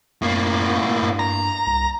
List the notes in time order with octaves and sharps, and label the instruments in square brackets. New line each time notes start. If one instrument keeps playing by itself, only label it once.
[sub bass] F#2 [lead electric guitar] A2 A#3
[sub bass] G2
[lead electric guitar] A#5
[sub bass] C2